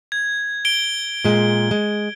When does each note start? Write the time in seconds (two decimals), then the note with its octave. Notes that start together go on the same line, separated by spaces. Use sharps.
0.12 G#6
0.65 D7 G7
1.25 A#2 G#3
1.71 G#3